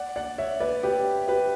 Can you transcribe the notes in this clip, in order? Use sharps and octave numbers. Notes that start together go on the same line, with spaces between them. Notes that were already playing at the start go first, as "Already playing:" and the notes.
Already playing: D5 F#5
D5 F#5
C#5 E5
B4 D5
G4 B4
G4 B4